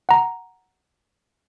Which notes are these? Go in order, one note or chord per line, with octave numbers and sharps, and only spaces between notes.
F#5 A#5